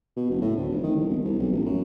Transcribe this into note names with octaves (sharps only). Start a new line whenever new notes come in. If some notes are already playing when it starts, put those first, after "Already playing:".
B2
F#1
A2
D2
F1
D#3
C2
E1
C2
B1
A1
F#2